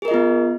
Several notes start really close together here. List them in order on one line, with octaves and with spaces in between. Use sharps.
G#4 A#4 D#5 F4 B3